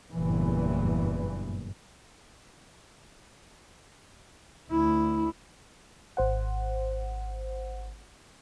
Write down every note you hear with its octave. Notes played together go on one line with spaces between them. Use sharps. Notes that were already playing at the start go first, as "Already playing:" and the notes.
F#1 E2 G2 A#2 E3
D2 E4
G#1 C5 F#5